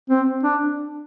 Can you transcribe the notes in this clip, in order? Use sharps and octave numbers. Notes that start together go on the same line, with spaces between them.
C4
D4